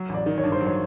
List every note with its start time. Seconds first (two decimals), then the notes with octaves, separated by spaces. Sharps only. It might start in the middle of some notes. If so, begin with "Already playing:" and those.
Already playing: F#3
0.09 A1 D5
0.26 D#3
0.38 C#5
0.43 G2
0.52 C5
0.61 F#3
0.66 C#5